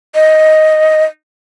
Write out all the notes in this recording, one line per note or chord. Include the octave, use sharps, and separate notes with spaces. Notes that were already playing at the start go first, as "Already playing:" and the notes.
D#5